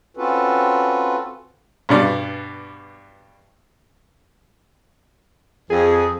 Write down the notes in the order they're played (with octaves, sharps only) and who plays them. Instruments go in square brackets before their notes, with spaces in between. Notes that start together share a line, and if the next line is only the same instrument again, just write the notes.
[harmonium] C4 C#4 F4 F#4 A4 B4
[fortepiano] G2 B2 D5
[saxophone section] F2 [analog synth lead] G#4